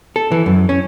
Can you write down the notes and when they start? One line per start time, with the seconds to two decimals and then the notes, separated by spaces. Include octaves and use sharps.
0.16 A4
0.32 E3
0.46 F#2
0.69 C#4